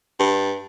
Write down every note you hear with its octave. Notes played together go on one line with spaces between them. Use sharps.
G2